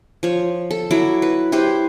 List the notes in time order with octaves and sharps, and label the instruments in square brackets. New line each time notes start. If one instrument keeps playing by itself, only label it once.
[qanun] F3 C#5
A4
F#3 E4 D6
B4
E4 G4 B4 C5